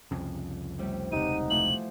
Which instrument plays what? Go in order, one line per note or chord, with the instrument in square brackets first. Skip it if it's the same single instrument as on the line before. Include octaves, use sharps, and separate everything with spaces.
[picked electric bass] C2 F2 C#3
[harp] A2 C3 G3
[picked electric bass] E1 C#2 C3 [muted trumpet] D#4 [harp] G4 F#5 [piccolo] D#7
[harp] E3 F3 A3 [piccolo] F#7